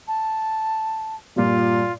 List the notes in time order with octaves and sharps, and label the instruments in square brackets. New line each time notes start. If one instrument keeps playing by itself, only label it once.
[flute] A5
[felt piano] G2 A#2 [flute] F4